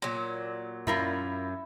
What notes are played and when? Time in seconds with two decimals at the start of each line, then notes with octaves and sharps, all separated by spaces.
0.02 A#2 F#3
0.87 F#2 E4 F4 A#4 B5